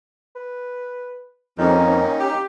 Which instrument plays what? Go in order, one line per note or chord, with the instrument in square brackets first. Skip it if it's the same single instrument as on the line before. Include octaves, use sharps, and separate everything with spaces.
[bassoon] B4
[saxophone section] F2 [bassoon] D#3 [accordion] A#3 C#4 D#4
[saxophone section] G4